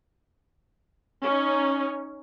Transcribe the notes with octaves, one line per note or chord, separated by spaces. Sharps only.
C#4 D#4